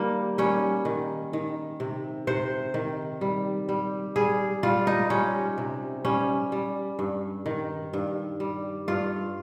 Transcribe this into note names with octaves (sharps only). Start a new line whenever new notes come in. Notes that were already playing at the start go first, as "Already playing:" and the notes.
Already playing: D#3 G3 A#3
G3 C#4
D#3
D#3
C3
C3 C5
D#3
G3
G3
G3 G#4
G3 F4
D#4
G3 C#4
C3
G3 C#4
G3
G2
D#3
G2
G3
G2 F4